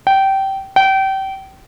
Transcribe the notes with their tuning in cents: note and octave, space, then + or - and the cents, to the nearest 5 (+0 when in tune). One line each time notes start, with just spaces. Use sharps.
G5 -20
G5 -30